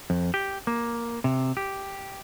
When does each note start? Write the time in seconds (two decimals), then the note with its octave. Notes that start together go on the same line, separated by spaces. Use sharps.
0.10 F2
0.34 G4
0.67 A#3
1.24 C3
1.57 G4